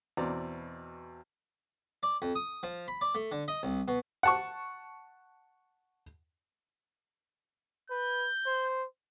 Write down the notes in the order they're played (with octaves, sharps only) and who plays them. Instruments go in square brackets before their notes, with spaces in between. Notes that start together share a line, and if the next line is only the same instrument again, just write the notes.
[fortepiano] E2 B2 C4 D5 A#5 C6
[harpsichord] D5
F2
D#6
F3
B5
D5
A3
D3
D#5
C2
B2
[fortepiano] F#5 A5 C#6
[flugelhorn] B4 [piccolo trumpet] G6
[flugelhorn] C5